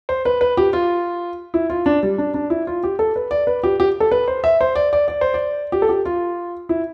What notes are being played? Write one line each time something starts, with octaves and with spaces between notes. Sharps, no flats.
C5
B4
B4
G4
F4
E4
F4
D4
G3
D4
D4
E4
F4
G4
A4
B4
D5
B4
G4
G4
A4
B4
C5
E5
C5
D5
D5
D5
C5
D5
G4
A4
G4
F4
E4